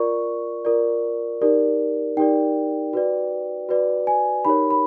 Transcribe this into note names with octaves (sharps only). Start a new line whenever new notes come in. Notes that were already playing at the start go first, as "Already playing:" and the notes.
Already playing: F4 A#4 D5 C#6
F4 A#4 D5
D#4 G4 A#4 D5
D#4 G4 A#4 D5 G5
F#4 B4 D5
F#4 B4 D5
G#5
D#4 G4 A#4 C#5 B5
B5